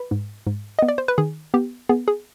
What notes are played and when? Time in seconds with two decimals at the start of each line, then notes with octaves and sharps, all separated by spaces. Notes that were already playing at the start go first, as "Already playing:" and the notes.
Already playing: B4
0.11 G#2
0.47 G#2
0.79 B3 D#5
0.88 D5
0.98 C5
1.08 B4
1.18 D#3 G#4
1.54 B3 G4
1.89 B3 G#4
2.08 G#4